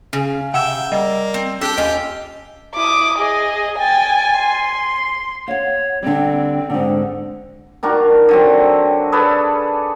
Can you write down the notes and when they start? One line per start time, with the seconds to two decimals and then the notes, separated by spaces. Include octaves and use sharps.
0.13 C#3 C#4
0.54 C3 E5 F#5 G5 E6 E7
0.92 G3 A#3 D#5
1.34 C4
1.61 D4 G4 A4 G5
1.78 D#2 C#4 F4 D#5
2.75 E4 D6 D#6
3.19 G#4 D#5
3.79 G5 G#5 A6
4.40 C6
5.48 C#5 F5 F#5
6.02 D3 G3 C4
6.70 G#2 D3
7.83 D#3 D4 F#4 A#4
8.29 D3 F#3 C4
9.12 G#4 A4 B4 D5